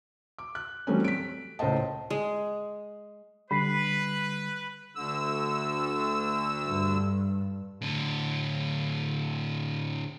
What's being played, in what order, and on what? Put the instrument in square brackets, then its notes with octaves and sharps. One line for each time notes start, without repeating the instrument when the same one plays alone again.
[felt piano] D6
F#6
E3 F#3 G3 A3 C4 C#4
B6 D7
C#2 A2 C5 D#5 A5
[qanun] G#3
[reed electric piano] D3 G3 [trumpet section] B4 [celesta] B5 B6 C7
[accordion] D2 D3 E6
[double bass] G2
[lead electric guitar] A2 D3